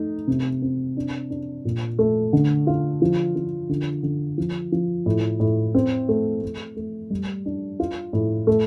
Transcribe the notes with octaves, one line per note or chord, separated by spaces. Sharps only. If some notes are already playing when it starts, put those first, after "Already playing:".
Already playing: A3 D#4
C3
C4
D4
D4
A#2
A3
D3
F4
F3
F3
D3
D3
F3
F3
A2
A2
C4
A3
A3
A3
G3
D4
F4
A2
A3